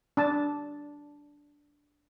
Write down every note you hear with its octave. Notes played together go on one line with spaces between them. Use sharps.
D4 A5